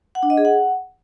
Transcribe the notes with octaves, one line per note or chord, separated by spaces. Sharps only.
F#5
D4
D#5
G#4
F#5